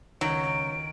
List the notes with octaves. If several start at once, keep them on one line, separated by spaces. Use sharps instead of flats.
C#2 D#3 F#3 D7